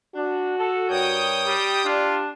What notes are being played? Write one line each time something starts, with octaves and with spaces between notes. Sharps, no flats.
D4 F#4
A4
G2 A#4 C#5 G5 D#6 G6
G3 G4
D4 F4